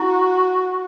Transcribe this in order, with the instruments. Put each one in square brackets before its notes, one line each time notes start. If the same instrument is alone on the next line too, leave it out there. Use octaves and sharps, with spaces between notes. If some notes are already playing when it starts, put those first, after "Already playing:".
Already playing: [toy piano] E4 [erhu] F#4